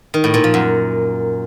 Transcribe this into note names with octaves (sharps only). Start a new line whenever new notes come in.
D#3
A2
A#2
F3
F#2